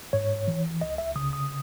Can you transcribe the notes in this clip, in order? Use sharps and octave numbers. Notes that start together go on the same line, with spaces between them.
G#2 C#5
E3
C#2 D#5
E5
C#3 D#6
D#6